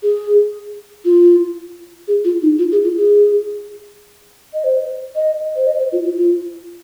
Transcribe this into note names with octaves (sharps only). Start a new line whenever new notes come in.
G#4
F4
G#4
F4
D#4
F4
G#4
F4
G#4
D#5
C5
D#5
C5
D#5
C5
F4
F4
F4